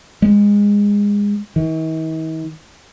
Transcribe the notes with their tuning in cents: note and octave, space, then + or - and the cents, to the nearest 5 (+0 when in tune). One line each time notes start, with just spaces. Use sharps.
G#3 -25
D#3 +45